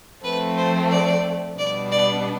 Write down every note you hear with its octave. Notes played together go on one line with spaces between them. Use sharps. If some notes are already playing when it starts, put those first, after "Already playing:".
F3 A3 C4 B4
C5
D5
B2 G3 B3 D4 D5
D5